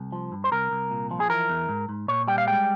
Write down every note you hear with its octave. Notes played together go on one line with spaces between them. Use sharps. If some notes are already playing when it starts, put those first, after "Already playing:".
Already playing: C2
F3
G2
C5
C2 A#4
C2
A#2
F3
G#4
E3 A#4
E2
G#2
G#2
A#2 C#5
G3 G5
F5
G#3 G5